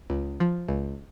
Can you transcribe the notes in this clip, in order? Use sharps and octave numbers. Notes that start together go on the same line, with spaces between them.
C#2
F3
C#2